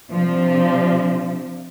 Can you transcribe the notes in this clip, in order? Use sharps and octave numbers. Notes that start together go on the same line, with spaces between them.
C3 F3 D4